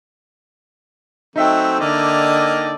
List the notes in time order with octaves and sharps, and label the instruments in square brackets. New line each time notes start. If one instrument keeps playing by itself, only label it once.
[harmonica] F#3 A3 C4 [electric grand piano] D#4 E5 G5
[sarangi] D3 [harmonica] A#3 D5 D#5